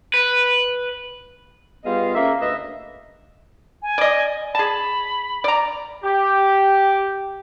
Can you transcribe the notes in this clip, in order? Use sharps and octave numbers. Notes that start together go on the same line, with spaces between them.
B4
G3 B3 F4 G#4 D#5 F5
C#3 A#3 E5
D2 B4 D#5 E5
G#5
D5 D#5
G#4 A5 B5
D5 A#5
G4